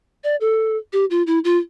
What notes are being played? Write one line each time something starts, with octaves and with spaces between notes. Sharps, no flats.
D5
A4
G4
F4
E4
F4